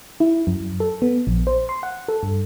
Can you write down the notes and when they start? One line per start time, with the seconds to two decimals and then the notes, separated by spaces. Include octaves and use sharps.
0.20 E4
0.47 F#2
0.80 A4
1.02 B3
1.27 A#1
1.47 C5
1.69 C6
1.83 F#5
2.08 A4
2.23 G2